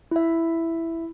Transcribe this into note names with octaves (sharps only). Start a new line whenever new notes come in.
E4 E5